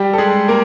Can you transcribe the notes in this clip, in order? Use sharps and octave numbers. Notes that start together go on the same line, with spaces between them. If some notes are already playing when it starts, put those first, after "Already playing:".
Already playing: G3 G4
A4
G#3 G#4
A#3 A#4